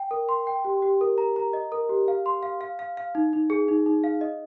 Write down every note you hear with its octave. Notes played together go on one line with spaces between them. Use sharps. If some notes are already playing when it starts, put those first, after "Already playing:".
Already playing: G5
A#4
C6
G5
G4
G4
A#4
A#5
A#5
D#5
A#4
G4
F5
C6
F5
F5
F5
F5
D#4
D#4
G#4
D#4
D#4
F5
D#5